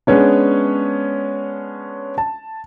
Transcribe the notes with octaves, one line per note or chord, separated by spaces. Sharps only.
G#3 B3 C#4 D4
A5